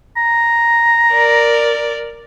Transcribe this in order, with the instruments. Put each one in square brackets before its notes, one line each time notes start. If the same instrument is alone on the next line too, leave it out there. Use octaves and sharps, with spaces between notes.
[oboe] A#5
[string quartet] A#4 D5